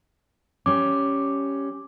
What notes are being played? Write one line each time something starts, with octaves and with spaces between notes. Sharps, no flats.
G3 C#4 D6